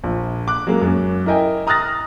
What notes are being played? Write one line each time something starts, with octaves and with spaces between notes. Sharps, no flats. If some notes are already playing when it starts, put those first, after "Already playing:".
A#1
D6 F#6
F#3 G#3 A#3 C#4
F#2 C#4
E4 A#4 D#5 G5 G#5
A#5 D#6 F6 F#6 A6 A#6